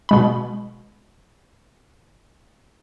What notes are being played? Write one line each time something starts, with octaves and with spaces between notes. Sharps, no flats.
B2 G#3 B5